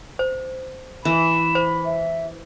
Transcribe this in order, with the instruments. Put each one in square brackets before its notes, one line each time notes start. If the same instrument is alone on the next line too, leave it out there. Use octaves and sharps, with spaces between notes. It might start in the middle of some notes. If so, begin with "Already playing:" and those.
[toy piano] C5
[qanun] E3 [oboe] B5 [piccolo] E7
[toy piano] C5
[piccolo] E5